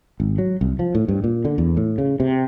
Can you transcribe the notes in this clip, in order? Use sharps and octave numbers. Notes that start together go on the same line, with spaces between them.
G#1
F#3
C2
F3
A2
G2
A#2
D3
E2
A2
C#3
C3